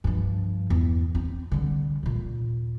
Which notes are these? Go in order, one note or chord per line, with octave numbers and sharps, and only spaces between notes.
G2 F3
E2
C4
D3 G3
D#2 A#2